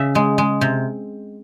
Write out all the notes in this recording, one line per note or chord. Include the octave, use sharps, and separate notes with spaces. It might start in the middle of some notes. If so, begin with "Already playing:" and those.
Already playing: C#3 E5
G#3
G#3
C3